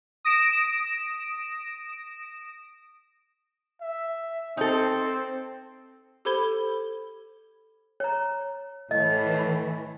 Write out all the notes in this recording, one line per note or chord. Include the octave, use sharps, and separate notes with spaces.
D#6 A#6 D7 E7
E5
C4 D#4 A4
G4 A4 C5 B5 G#6 G7
C#5 A#5
A2 E3 D#5